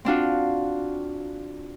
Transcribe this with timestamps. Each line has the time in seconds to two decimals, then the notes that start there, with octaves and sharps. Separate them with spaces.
0.05 C4 D4 F4 F#4